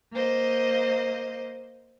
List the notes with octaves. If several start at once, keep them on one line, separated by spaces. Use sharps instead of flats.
A#3 C5 D#5